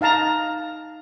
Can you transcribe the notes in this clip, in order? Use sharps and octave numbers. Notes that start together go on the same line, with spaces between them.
D#4 F5 A5 A#5